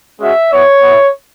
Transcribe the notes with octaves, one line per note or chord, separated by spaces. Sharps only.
G#3 C#4 F#4 E5
B3 E4 C#5
B3 E4